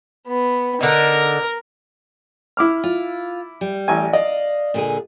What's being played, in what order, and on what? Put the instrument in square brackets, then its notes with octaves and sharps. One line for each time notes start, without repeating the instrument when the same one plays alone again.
[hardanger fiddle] B3
[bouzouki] D3 D#4 [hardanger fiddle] A#4
[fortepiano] E4 D6 F6
[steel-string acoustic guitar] F4
G3
[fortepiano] A1 G#5
[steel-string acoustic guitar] D5 F5 [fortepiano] D#5
[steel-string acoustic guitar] A#2 D3 G#4